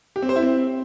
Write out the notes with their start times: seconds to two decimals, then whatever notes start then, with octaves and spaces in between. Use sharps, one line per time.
0.16 G4
0.22 C4
0.29 C5
0.36 E4
0.42 C4